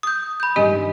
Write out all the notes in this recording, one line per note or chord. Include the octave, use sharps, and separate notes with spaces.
D#6 G6
B5 G6
G2 D#3 G#3 G4 D#5 G#5